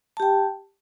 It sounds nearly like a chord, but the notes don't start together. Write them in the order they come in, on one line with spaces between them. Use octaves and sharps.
A5 G4 G5